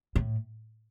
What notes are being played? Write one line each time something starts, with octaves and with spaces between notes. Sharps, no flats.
A2